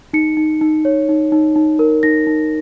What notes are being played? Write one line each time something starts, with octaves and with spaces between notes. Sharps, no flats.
D#4 C#7
D#4
D#4
C#5
D#4
D#4
D#4
A#4
D#4 A#6
D#4